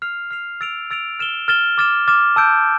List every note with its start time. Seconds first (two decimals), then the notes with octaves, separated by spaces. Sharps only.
0.02 F6 C7 F7
0.31 F6 C7 F7
0.61 E6 A6 D7 F7
0.90 E6 A6 D7 F7
1.19 F6 A6 E7 G7
1.48 F6 A6 E7 G7
1.78 D6 F6 A6 E7
2.08 D6 F6 A6 E7
2.36 A5 E6 G6 D7